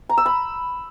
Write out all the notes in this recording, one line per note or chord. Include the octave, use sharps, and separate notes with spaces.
A#5
E6
B5